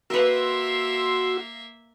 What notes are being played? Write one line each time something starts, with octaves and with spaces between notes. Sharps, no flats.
A#3 F#4 A#4 B4 E5 C6 E6